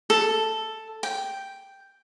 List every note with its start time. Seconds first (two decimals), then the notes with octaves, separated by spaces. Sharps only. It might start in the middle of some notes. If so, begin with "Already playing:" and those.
0.10 A4
1.03 G5